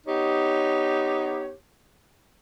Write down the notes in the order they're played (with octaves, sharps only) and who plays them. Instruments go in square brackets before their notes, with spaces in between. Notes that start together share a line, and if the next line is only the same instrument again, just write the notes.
[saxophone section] B3 D#4 G4 C#5